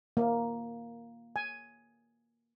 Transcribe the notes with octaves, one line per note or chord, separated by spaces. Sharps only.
A#3
G#5